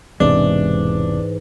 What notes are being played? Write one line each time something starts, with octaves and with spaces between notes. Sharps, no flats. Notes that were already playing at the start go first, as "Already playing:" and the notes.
E1 G#2 C3 E3 G#3 D4